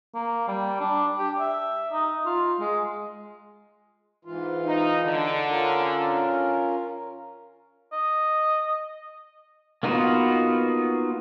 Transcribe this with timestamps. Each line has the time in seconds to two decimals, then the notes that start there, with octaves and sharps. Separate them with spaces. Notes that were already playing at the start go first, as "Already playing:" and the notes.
0.14 A#3
0.48 G3
0.80 D4
1.18 G4
1.40 E5
1.92 D#4
2.26 F4
2.60 G#3
4.25 G#2 E3 F4
4.65 D#4
5.04 D3
5.50 C#4 F4 A#4
7.93 D#5
9.83 A#3 B3 D#4 F4 F#4